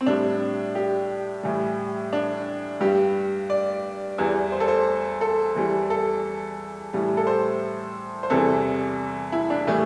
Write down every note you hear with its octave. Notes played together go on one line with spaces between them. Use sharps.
C4
A2 G3 D4
G4
A2 E3 G3
D4
G2 G3 G4
D5
E2 E3 G3
C5
A4
C5
A4
E2 E3 G3
A4
A2 E3 G3
A4
C5
C5
E2 C3 E3 G3 A4
E4
D4
A2 E3 G3 A3